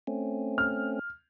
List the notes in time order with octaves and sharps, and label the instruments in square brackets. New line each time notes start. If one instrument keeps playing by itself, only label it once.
[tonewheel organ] A3 C4 C#4
[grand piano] F6